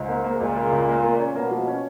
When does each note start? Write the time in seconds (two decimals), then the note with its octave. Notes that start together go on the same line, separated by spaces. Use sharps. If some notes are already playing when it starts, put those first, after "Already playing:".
Already playing: C#2 G#2
0.08 A#3
0.24 A#3
0.40 C#2 A#2
0.56 C#3
0.72 C#2
0.88 A#3
1.03 A#3
1.19 C#4
1.35 B2 A#3
1.51 F3
1.67 C#4